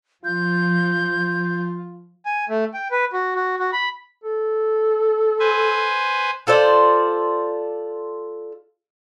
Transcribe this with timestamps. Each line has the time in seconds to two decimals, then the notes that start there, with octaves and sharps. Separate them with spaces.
0.25 F3 F4 G6
2.25 G#5
2.49 A3
2.74 G5
2.91 B4
3.13 F#4
3.35 F#4
3.59 F#4
3.73 B5
4.24 A4
5.40 B4 C5 G#5
6.47 F4 A4 C5 D5